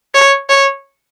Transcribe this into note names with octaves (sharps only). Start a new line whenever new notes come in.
C#5
C#5